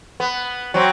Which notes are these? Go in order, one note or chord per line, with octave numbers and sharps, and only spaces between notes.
B3
F#3 C4